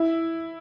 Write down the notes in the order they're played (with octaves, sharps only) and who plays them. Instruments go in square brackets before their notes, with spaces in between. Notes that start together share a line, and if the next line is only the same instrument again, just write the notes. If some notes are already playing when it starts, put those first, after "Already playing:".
Already playing: [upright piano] E4